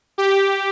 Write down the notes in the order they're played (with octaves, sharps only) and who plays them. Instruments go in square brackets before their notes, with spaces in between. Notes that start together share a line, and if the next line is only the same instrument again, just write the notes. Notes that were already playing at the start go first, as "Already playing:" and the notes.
[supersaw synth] G4